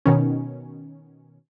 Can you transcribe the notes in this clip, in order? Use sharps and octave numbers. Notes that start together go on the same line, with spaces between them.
B2 D#3 C#4